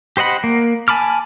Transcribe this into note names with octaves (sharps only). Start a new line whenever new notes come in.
G4 C5 D#5 F#5 B5
A#3
G#5 A5 B5 D6 F6